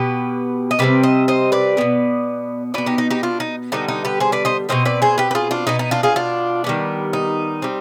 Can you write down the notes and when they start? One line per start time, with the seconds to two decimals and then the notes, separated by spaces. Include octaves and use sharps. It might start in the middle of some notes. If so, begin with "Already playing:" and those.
Already playing: B2 B3 G4 B4
0.71 D#5
0.79 C3 G3 C4 B4 D5
1.03 C5 D#5
1.28 C5 D#5
1.52 B4 D5
1.77 B2 G3 B3
2.74 B2 B3 B4 D5
2.86 D#4 G4
2.98 D#4
3.10 D#4 G4
3.23 D4 F4
3.40 D#4
3.72 D3 G3 B3 D#4
3.88 D#4
4.05 G4 B4
4.20 G#4 C5
4.32 B4 D5
4.45 C5 D#5
4.69 B2 G#3 C4 C5 D#5
4.85 B4 D5
5.02 G#4 C5
5.18 G4 B4
5.31 B4
5.35 F4 G#4
5.51 D4 F4
5.67 B2 B3 D#4
5.79 D#4
5.91 D4 F4
6.03 F4 G#4
6.16 D4 F4
6.64 D#3 G3 B3
7.13 D#4
7.62 G3 C4